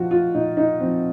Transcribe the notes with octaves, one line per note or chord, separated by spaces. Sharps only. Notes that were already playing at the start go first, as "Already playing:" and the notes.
Already playing: A#2 F3 F4 F#4
F4
A#2 D#4
D#4
F3 C4